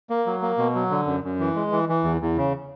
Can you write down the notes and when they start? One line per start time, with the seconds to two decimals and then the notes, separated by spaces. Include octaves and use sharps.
0.10 A#3
0.26 F#3
0.42 A#3
0.58 B2
0.75 F#3
0.91 D3
1.07 F#2
1.24 F#2
1.39 E3
1.56 G#3
1.72 E3
1.89 E3
2.04 E2
2.21 E2
2.37 C#3